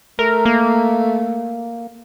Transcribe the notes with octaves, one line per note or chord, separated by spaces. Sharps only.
A3 A#4
A#3